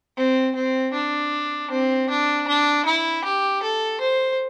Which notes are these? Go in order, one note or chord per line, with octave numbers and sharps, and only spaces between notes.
C4
C4
D4
C4
D4
D4
E4
G4
A4
C5